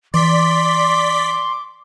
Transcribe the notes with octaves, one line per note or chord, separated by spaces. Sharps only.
E3 D5 C6 D6 B6